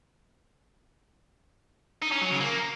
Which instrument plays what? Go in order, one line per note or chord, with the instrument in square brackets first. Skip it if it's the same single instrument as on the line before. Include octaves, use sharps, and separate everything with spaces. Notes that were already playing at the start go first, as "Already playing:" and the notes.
[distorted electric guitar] D#4
C#4
F#3
C#3
A#3